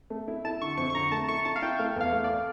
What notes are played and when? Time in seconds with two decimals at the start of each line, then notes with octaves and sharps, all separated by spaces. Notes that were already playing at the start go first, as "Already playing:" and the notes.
0.10 A3
0.28 E4
0.45 E4 A5
0.61 D3 C#6
0.77 F2 C#6
0.90 C#6
0.95 D3 A#5
1.12 A3 A5
1.28 E4 C#6
1.45 E4 A5
1.56 F5
1.62 E4 G5
1.79 A3 F5
1.96 E2 F5
2.12 A3
2.24 D5